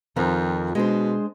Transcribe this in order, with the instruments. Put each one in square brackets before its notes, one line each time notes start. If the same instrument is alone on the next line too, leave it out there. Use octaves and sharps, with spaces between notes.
[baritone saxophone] F2 [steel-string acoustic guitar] D#3 F3 C4
[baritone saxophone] B2 [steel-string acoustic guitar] G#3 D4 C5